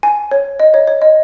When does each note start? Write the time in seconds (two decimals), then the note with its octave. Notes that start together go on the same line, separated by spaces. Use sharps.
0.03 G#5
0.31 C#5
0.60 D#5
0.74 C#5
0.87 C#5
1.02 D#5